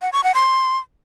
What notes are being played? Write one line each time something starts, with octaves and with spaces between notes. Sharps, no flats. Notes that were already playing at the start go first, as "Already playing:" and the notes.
F#5
C#6
F#5
C6